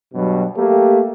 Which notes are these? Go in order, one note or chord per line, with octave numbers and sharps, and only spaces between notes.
G2 B2 F#3
A3 A#3 G4